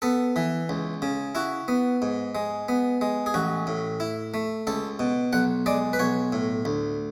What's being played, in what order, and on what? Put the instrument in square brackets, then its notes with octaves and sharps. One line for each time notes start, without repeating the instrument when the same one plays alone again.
[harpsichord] B3 A4
E3
C#2
C#3
E4 F#4
B3
G#2
G#3
B3
G#3
G#4
A1 F#4
A2
E4
A3
C#2 A4
B2
B1 F#5
G#3 D5
B4
B1 C#5
A2
D2